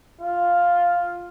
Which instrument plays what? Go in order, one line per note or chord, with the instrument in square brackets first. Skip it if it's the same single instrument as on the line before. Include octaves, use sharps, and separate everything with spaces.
[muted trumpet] F4